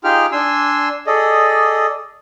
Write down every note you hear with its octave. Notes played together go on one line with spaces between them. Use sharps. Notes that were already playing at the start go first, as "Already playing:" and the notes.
D#4 F4 G4 G#4 G5 F6
D4 G#5 C6 E6
G#4 A4 D5 D#5